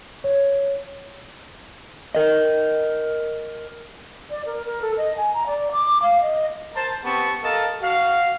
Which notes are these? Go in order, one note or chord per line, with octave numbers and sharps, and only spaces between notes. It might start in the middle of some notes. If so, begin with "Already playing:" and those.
C#5
A#4 D#5
D5
A#4
A#4
A4
D#5
G#5
A#5
D5
D6
F5
D#5
A#4 C5 A5
B3 C4 G4 A5 C#6
A4 A#4 D#5 F5 A5
F#4 F5